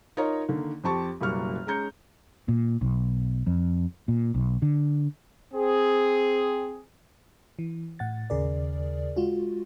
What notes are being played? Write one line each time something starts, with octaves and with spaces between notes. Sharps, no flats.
D#4 F4 A#4 C#5 D#5 A#5
D3 D#3 A#3
F2 C4 G4 A5 C#6
F#1 B2 G3 A#3 C#6 F6
G#3 C#4 A#5 G6 C#7
A#2
B1
F2
A#2
B1
D3
C4 G#4
E3
A2 F#5 A6
D#2 C#3 G#4 A#4 D5
G#3 F4 F#4